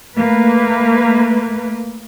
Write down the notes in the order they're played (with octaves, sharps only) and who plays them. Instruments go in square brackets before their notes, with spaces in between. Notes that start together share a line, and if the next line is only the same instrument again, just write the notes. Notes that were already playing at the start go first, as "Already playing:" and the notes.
[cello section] A3 A#3 B4